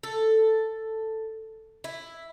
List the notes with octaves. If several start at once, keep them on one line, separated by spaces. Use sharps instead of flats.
A4
E4